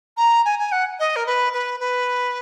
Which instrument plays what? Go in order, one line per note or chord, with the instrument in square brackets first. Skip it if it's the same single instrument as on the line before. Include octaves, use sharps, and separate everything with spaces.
[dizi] A#5
G#5
G#5
F#5
D#5
A#4
B4
B4
B4